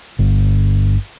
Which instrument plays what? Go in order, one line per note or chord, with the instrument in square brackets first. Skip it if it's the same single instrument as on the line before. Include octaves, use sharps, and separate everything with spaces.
[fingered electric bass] G1